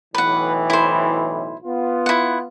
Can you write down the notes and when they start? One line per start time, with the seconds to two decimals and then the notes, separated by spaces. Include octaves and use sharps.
0.15 B1 A2 E3 B4 F#5
0.70 E4 C5
1.64 B3 F4
2.06 E4 F#5